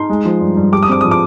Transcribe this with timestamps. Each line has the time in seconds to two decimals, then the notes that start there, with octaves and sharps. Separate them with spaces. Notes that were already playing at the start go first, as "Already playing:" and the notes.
Already playing: D#4 C6
0.10 G#3
0.25 F3
0.41 G2
0.57 G2
0.72 G4 D6
0.83 D#6
0.89 C4 D6
1.01 F3 D#6
1.11 D6